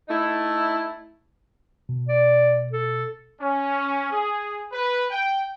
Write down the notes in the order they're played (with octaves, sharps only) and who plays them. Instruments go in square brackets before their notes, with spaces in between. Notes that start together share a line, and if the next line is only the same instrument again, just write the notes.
[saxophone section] A3 D#4 E4
[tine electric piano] B2
[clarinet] D5
A4
[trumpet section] C#4
G#4
B4
G5